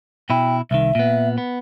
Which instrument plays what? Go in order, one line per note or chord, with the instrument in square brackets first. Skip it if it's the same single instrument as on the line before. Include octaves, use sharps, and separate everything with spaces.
[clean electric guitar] B2 E4 [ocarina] G5
[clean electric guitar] C2 D#3 [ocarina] E5
[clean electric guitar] A#2 B3
B3